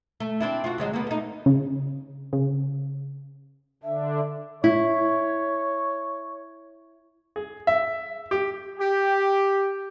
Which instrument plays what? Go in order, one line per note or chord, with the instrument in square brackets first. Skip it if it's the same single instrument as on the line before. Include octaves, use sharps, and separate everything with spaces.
[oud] A3
C4 D4 E4
F4 F#4
D2 F#3 G#3
A#3 B3
A3 D#4
[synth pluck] C#3
C#3
[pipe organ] D3 D4 [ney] E5
[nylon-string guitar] E4 [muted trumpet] C#5
[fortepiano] G#4
E5
G4
[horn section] G4